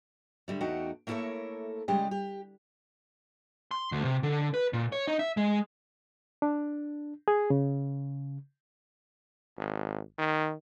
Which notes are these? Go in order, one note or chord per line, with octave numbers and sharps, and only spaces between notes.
D3 G3 A3
E2 A3 D#4 F#4 F#5 G5
A3 A#3 E4 A4 A#4 C#5
C#3 G3 G#3 G4 D#5
G4
C6
D2
C3
D3
B4
A#2
C#5
D#4
E5
G#3
D4
G#4
C#3
G#1
D#3